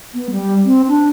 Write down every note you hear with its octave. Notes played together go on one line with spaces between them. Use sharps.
B3
G3
C4
D4